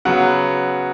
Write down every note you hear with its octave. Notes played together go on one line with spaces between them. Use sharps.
C#3 F#3 B3 F#5